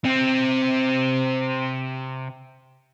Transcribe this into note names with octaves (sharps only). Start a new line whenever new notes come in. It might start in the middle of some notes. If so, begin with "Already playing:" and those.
C3 C4